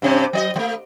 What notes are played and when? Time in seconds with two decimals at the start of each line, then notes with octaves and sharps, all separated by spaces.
0.02 G2 C3 C4
0.33 F#3 D5 D#5
0.56 F#3 A3